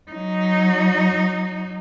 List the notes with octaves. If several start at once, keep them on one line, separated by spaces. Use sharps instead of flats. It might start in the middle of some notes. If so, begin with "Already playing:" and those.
F#3 D#4